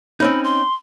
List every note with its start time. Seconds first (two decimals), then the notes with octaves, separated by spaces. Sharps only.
0.20 C4 C#4 D#4 B5
0.44 C6